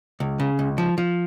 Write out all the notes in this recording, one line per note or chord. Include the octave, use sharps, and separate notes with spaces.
C#2
C#3
C#2
F3
F3